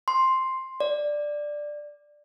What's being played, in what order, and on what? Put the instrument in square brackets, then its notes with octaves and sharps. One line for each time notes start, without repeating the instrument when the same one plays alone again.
[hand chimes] C6
D5